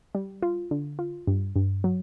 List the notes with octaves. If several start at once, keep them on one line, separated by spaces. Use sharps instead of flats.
G3
F4
D3
F4
G2
G2
F#3